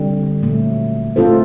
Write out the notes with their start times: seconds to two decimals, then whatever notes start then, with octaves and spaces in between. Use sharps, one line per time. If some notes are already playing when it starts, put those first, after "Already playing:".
Already playing: D3 G3 C4
0.43 A#2 F#3 A3
1.16 A3 C4 F4 A4 C5